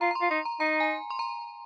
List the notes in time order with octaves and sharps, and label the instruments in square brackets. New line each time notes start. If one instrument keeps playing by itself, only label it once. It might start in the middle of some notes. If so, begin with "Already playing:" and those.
[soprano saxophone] F4 [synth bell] A#5
[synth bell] A#5
C6
[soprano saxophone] F4
[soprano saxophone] D#4 [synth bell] C6
[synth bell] A#5
[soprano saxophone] D#4 [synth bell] A#5
[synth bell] G#5
C6
A#5